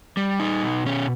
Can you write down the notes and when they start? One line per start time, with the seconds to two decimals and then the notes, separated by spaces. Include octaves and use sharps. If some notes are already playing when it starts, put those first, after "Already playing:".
0.17 G3
0.40 D#4
0.63 B2
0.86 C#4